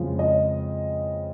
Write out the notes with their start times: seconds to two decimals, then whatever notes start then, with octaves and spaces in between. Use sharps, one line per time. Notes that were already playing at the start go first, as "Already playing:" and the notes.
Already playing: F2 C#3 F3 G#3
0.19 D#5